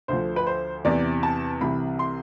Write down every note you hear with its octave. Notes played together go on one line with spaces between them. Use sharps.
D2 D3 F3 C5
B4
C5
E2 C3 E3 D5
A5
C2 C3 E3 B5
C6